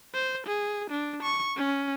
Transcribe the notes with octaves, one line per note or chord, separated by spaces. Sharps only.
C5
G#4
D4
C#6
C#4